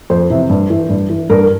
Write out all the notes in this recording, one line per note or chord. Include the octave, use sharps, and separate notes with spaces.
F2 C5
C3 E3
G2
E3
G2
E3
G2 A#4